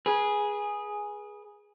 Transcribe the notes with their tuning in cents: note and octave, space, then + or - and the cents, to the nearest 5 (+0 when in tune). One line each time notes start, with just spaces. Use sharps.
G#4 +0 B4 -30